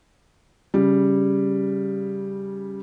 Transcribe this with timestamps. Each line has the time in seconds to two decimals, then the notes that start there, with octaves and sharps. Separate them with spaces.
0.74 C#3 G3